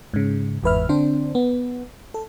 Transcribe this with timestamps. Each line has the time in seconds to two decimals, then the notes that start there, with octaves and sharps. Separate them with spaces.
0.14 G#2 C#3
0.63 G1 E2 G#2 B4 E5 F6
0.89 D3 C4 D4 C5
1.35 B3
2.14 A4